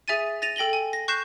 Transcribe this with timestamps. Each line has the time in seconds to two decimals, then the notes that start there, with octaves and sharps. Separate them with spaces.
0.08 G#4 E5 G#5 A6 D#7
0.42 A6 A#6 D#7 F7
0.56 A4 G5 A#6 F#7 G7
0.73 G#5
0.93 A#6
1.08 C#6 F#6 G6 A#6 C7 E7